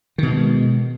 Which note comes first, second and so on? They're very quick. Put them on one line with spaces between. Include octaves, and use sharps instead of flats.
D#3 B2 G#3